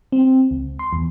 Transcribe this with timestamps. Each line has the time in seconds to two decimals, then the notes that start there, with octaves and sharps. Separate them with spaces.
0.12 C4
0.51 C#2
0.79 C6
0.93 E2